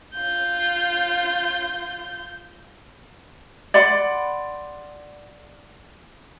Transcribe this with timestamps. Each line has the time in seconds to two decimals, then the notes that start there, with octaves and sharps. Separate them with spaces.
0.14 F4 G6
3.74 D5 F#5 B5 C6